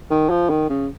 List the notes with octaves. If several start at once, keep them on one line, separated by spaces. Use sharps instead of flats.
D#3
F3
D#3
C#3